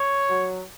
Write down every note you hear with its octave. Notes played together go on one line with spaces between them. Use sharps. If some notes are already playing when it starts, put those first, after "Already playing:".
Already playing: C#5
F#3